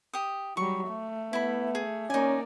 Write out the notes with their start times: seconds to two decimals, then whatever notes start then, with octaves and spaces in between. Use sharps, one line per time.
0.13 G4 D#6
0.57 F#3 G3 C#6
0.88 A3
1.33 B3 E4 B5
1.75 G#4
2.10 A#3 C#4 D#4 D5 G#5